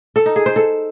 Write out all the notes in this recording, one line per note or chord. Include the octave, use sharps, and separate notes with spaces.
A4
D#4
G#4
C5
A4